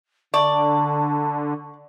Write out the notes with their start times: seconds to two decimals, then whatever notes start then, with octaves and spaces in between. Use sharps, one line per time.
0.34 D3 D5 A5 C#6